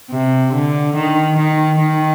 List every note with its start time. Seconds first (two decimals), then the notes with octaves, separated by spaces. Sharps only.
0.10 C3
0.53 D3
0.95 D#3
1.37 D#3
1.79 D#3